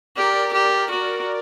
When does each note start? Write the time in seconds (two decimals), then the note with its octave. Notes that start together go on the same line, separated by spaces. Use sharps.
0.17 G4 A#4 D5
0.53 G4
0.90 F#4